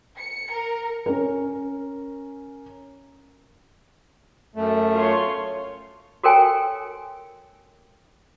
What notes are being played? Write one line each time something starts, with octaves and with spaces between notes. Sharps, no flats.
C#7
A#4
C#4 A#4
F#2 A3
F4 C#5 C6
F#4 A4 A#4 C#5 G5 G#5